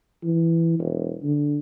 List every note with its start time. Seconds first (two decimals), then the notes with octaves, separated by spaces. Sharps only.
0.24 E3
0.79 E1
1.23 D3